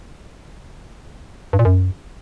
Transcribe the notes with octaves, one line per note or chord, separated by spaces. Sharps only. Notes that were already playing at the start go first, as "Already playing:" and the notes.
G2
A#2
F#2